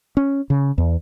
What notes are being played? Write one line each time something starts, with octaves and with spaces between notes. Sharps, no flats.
C#4
C#3
E2